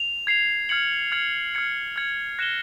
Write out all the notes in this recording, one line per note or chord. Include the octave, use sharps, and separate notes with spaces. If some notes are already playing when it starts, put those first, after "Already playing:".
Already playing: F7
G#6 C7 F7
F6 G#6 C#7 F#7
F6 G#6 C#7 F#7
F6 G#6 C#7 F#7
F6 G#6 C#7 F#7
F#6 A#6 C#7 E7 G7